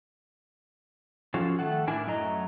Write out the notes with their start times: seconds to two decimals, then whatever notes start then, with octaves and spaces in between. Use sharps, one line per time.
1.34 F3 C#4 F4 F#4 A4
1.59 D#3 A3 A4 F#5
1.87 A2 D4 E4 A#4 G#5
2.07 F#2 F#3 A3 D#5 A#5